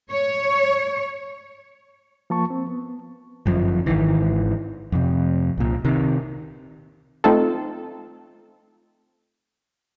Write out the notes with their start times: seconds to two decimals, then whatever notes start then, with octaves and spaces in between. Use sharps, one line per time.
0.11 C#5
2.30 F3 A#3 A5 C#6
2.50 C4
2.68 B3
3.46 G1 F#2 F3
3.86 G#1 D2 D#3 E3
4.92 F2 C3
5.58 C2 A#2
5.85 C3 D#3
7.24 A3 C4 D#4 F4 A4